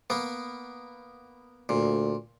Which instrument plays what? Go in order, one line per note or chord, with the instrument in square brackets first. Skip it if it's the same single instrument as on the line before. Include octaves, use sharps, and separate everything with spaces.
[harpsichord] A#3 B3
[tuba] D2 [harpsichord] A#2